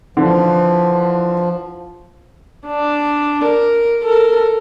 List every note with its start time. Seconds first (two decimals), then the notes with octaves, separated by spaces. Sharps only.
0.17 D3 E3 F3
2.67 D4
3.45 A#4
4.03 A4 A#4